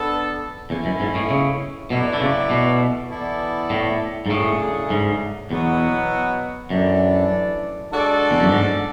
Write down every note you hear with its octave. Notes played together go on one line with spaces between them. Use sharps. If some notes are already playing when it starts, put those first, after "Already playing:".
Already playing: B3 D4 A4
E2 B2 A3 C#4 E4
F#2
G#2
A2
C#3
B2 F#3 A3 E4 B4 D5
D3
C#3
B2
E3 B3 E4 A4 D5
A2
G#2
A2 C#3 F#3 A3 D4 G#4
G#2
E2 B2 F#3 B3 F#4
F#2 E3 A3 D4 A4 D5
G#3 D4 F#4 A4 D5
E2
F#2
G#2